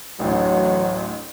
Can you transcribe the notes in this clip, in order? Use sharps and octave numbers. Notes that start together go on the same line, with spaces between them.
A1 D2 F#3